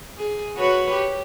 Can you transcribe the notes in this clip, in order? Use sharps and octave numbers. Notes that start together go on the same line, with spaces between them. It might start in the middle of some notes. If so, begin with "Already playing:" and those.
G#4
F#4 B4 C#5
G4